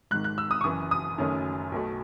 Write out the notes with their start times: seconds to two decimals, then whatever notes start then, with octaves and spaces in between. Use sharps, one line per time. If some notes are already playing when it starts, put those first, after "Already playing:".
0.11 G#1 G#2 D#3 F#6
0.24 F#6
0.38 E6
0.51 D#6
0.61 C#6
0.64 F#1 F#2 E3 D#6
0.91 D#6
1.18 F#1 F#2 D#3 A3 C#4
1.72 B1 B2 A3